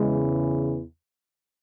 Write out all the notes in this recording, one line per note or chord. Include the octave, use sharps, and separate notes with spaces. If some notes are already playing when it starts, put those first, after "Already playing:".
Already playing: E2 C#3 E3 G#3